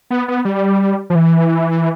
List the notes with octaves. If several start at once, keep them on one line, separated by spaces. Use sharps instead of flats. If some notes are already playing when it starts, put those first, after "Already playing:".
B3
B3
G3
F3
E3